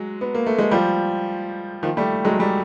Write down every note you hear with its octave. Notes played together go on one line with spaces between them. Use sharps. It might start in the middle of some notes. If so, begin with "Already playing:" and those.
Already playing: F#3 G#3
B3
A#3
A3
G#3
F3 G3
D#3 F3
G3 A3
F#3 G#3
G3 A3